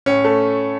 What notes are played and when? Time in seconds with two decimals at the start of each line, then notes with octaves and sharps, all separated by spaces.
0.06 A2 C#4
0.25 A3